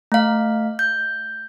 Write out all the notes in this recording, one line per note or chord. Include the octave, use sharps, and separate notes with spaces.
A3 F5
G6